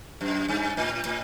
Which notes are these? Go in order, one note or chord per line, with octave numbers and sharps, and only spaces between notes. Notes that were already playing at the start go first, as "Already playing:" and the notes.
F#2
G2
A2
A2